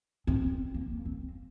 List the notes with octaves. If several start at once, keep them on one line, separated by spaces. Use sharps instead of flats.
C4
A#3
C4